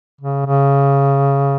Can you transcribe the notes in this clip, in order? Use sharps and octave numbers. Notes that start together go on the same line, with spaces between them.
C#3
C#3